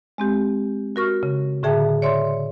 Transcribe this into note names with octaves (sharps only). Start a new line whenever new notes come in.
G#3 C4 G4
F#4 A#4 C#6 F6
C#3
A2 D3 G#4 E5 G5 A5
C#5 D5 E5 C6